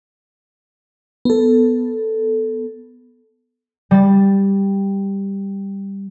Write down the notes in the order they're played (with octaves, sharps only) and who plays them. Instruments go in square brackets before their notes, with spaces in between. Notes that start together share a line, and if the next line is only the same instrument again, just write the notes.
[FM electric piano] B3 A4
[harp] G3 A6